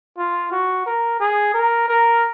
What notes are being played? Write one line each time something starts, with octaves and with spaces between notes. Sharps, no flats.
F4
F#4
A#4
G#4
A#4
A#4